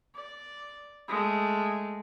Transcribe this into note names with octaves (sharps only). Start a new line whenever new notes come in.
D5
G#3 A3